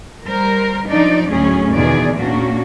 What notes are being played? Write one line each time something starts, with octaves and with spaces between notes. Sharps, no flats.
G3 A#4 C5
F3 D4 D#4 D5
D2 A2 F#3 C#4 G#4
E2 B2 D3 D#3 G#4 D5
A#2 A#3 C#4 D4 F#4